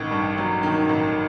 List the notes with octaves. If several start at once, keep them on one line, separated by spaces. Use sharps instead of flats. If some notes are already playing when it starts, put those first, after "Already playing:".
Already playing: A1 D#3 C#6
G2
F#3
D#3
A1